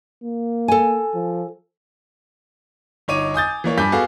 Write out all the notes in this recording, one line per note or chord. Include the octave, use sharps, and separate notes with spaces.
A#3
A4 G#5
F3
G1 D#4 C#5 D6 D#7
G#5 D#6 G6 A6
E3 A#3 C#5
G2 G#5 D6 G6 B6
B3 F#4 G#4 A4 F5